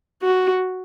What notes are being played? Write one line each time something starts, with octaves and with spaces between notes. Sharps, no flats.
F#4